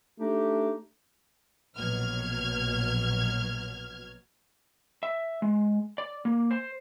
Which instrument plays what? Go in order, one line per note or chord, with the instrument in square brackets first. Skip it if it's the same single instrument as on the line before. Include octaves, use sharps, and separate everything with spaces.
[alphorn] A3 [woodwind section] D4 D#4 G4
[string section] A#1 B2 F#3 F6 G#6
[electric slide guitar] E5
G#3
D5
A#3
C5